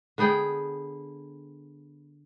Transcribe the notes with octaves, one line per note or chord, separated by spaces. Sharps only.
D3 B3 G#4 G5